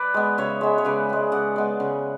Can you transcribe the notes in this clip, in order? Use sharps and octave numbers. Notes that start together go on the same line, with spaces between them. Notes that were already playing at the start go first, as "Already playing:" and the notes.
Already playing: B4 D5
G#3 B3
C#3 C#5 E5
G#3 B3
C#5
C#3 B4 D5
G#3 B3
C#3 D5 F#5
G#3 B3
C#3